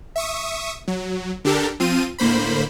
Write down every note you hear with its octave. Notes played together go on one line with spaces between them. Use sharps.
E5 C#6 D#6
F#3
D3 D4 G4 A4 A#4
F3 C4 F4 D#7
A2 D3 A#3 C5 B5